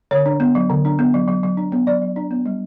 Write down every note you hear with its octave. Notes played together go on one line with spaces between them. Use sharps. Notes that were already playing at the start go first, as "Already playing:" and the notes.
D3 C#5
D4
B3
F#3
D3
D4
B3
F#3
F#3
F#3
D4
B3
F#3 D5
F#3
D4
B3
G3